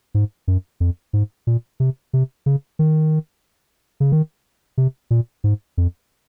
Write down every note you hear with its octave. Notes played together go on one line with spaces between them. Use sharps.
G#2
F#2
F2
G#2
A#2
C3
C3
C#3
D#3
C#3
D#3
C3
A#2
G#2
F2